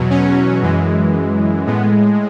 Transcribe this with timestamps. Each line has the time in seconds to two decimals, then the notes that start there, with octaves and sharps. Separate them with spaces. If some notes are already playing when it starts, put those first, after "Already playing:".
Already playing: E2 B2 F#3
0.10 C#4
0.62 F#2 E3 G#3
1.66 A2 G#3 B3